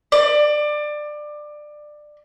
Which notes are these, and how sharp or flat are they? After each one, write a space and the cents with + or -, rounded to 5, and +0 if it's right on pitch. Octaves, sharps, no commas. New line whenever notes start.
D5 +20